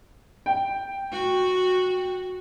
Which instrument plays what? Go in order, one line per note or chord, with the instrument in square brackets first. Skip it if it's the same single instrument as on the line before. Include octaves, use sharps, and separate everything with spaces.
[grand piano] G5
[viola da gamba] F#4